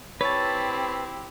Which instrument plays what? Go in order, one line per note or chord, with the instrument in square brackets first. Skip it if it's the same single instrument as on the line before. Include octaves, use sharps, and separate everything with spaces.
[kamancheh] C4 G4 [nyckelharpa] E4 [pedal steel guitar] B4 A5 [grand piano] C#5